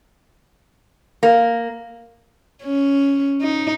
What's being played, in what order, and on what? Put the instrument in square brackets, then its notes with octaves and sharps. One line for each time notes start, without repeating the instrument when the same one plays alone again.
[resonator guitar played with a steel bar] A#3
[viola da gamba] C#4
D#4